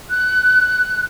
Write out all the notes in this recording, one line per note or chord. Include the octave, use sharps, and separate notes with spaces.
F#6